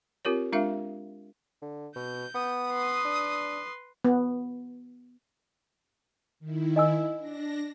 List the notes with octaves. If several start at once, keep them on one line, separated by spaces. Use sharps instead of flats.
C4 F4 G4 A#4 C#5
G#3 D4 F4 A#4 E5 F5
D3
B2 G6
B3 D#6
B4 C6
D4
B3
D#3 E4
D#5 G#5 E6
D4 A#6